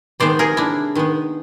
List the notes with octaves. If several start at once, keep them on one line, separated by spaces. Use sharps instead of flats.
C3 D#3 G#3 B3 C5 D5
G#4 A#4
D4 E4
D#3 G#3 B3